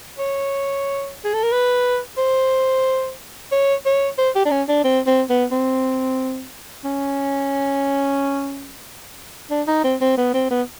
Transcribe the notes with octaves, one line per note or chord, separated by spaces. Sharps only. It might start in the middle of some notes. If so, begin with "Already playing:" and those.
C#5
G#4
A4
A#4
B4
C5
C#5
C#5
C5
G4
D4
C#4
D4
C4
C4
B3
C4
C#4
D4
D#4
C4
C4
B3
C4
B3